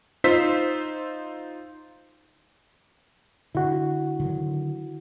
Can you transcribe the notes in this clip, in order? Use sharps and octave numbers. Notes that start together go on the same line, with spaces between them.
D#4 F4 C5 E6 B6
D3 E4 F#4
D3 D#3 F#3